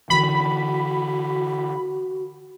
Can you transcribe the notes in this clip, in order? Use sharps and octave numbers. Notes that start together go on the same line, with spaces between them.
D3 E3 F#4 B5